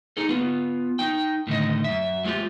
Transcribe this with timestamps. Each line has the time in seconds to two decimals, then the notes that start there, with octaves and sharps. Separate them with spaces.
0.17 D#4 G#4 A4
0.29 B3 F4
0.99 D#4 G5
1.47 A2 D3 D#3 D#5
1.84 F#2 E5
2.24 F#3 G#3 A3 F4 G4